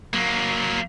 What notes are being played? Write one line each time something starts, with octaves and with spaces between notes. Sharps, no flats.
F#3 A#3